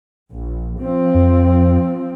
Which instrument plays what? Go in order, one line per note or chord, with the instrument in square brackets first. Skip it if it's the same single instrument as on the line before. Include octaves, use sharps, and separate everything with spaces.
[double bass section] A#1
F3 C4
[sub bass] F2